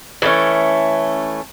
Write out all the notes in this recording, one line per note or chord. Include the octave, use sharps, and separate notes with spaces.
E3 A3 C#4